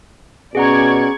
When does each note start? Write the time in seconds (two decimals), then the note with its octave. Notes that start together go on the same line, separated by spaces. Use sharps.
0.55 B2 C#4 G#4 D5 F#5 A#5 C#6 G#6